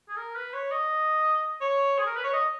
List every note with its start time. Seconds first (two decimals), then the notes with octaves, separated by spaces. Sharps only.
0.09 G#4
0.17 A#4
0.36 B4
0.53 C#5
0.72 D#5
1.61 C#5
1.98 G#4
2.06 A#4
2.16 B4
2.24 C#5
2.33 D#5